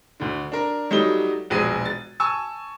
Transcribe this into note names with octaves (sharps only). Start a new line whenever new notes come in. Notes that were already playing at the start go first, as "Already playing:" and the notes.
D2 D3
D4 A#4
F#3 G3 A3 D#4 D#5 G7
E1 A#1 G#4 D#7
A6
G#5 A5 C#6 E6